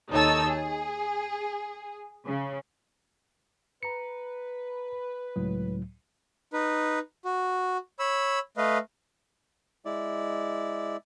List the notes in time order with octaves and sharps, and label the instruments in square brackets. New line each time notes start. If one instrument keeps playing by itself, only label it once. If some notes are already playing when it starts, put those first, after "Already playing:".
[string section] D#2 D#4 A4 C#5 A5 E6
G#4
C#3
[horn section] B4 [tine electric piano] A#5 C#7
[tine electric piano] C#2 A2 F#3
[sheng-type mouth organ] D#4 B4
F#4
C#5 B5 E6
A3 B4 D#5 F5
[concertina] G#3 E4 D5